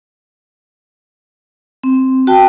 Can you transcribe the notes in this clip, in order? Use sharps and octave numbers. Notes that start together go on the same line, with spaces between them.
C4
F#4 G5 A5